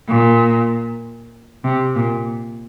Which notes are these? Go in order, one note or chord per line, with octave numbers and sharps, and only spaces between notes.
A#2
C3
A#2